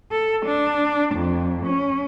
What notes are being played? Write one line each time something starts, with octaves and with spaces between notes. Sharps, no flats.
A4
D4
F2
C#4